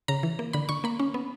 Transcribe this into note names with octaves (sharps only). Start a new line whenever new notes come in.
C#3 A#5
E3
A#3
D3 B5
D3 C#6
A#3 B5
C#4
B3